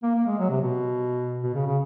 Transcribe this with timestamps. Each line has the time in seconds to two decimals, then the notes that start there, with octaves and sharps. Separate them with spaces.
0.03 A#3
0.15 A#3
0.26 G#3
0.39 F#3
0.50 C3
0.61 B2
1.43 B2
1.54 C#3
1.66 C#3